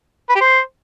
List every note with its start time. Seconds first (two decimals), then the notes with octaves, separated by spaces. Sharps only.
0.29 B4
0.35 G4
0.41 C5